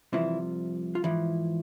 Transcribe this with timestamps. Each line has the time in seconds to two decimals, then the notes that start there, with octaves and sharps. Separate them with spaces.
0.13 C2 C3 E3 F3 E4
0.95 F4
1.04 G#2 E3 F3 E4